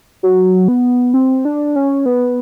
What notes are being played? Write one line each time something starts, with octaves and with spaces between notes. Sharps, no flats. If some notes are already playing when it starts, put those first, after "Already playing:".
F#3
B3
C4
D4
C#4
B3